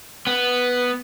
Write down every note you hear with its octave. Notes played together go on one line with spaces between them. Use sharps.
B3